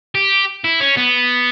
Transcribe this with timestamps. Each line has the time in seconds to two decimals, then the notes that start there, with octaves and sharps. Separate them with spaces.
0.15 G4
0.64 E4
0.80 C#4
0.97 B3